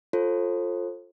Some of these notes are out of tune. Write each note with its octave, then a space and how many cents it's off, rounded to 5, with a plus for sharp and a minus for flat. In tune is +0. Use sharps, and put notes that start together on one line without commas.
F4 +10 A4 +5 C5 +30